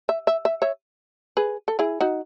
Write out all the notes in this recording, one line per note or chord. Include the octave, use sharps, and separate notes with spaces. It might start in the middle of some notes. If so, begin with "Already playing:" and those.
E5
E5
E5
C#5 E5
G#4 B4
A4
E4 G#4
D#4 F#4